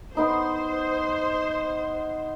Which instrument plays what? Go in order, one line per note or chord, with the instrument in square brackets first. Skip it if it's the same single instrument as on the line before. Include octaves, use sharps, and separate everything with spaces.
[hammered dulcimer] B3 D#4 D6 [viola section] C5